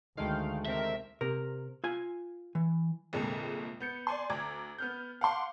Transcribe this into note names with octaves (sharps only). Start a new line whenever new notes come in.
D2 D#3 G#3 A3 F5 G5
C3 C4 A#4 E5
C3 A#4
F4 G#5
E3
C2 F2 A#2 D3 G#3 A3
B3 G6 C#7
D5 G#5 C6
D2 A#5 D6 G#6
B3 F6 G6
F5 F#5 C6 D6